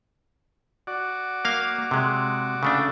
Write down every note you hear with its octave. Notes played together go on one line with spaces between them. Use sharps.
F#4 D5
A#3 F5
C3 G#3
C#3 A3 D4